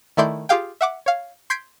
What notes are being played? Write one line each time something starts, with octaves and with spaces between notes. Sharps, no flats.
D#3 A3 E4 D5 C6 G6
F4 G4 G#4 F5 G5
E5 F#5 D6
C#5 F5
C6 G6 G#6 B6 C7 D7